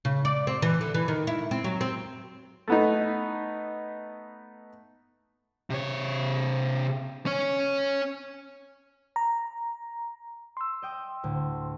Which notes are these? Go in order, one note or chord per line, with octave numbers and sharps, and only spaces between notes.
C#3
D5
C4
E3
D3
E3
D#3
E4
C4
F#3
C4
A3 B3 D#4
C3 C#5
C#4 C#5
A#5
C6 E6
D#5 G5 D#6
D2 A2